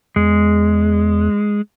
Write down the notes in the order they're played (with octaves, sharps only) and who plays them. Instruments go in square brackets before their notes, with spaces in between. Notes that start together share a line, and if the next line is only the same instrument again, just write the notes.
[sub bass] E2 [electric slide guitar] G#3